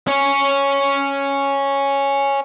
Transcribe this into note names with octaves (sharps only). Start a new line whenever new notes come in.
C#4 C#5